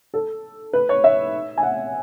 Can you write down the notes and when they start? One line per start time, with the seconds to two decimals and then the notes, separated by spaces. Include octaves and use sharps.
0.14 A4
0.73 B4
0.89 C#5
1.04 E5
1.58 G#5
1.63 F#5